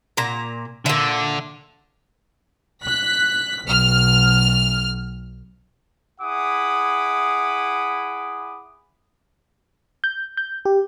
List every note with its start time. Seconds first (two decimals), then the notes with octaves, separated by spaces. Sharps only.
0.17 A#2 A#5
0.86 A#2 D3 E5
2.83 F#6 B6
3.65 B1 F6
6.21 E4 G#4 F#5 B5 D6 D#6
10.04 G6
10.37 G6
10.65 G4